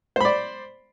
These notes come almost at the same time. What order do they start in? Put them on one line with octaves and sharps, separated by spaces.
C5 B5 D5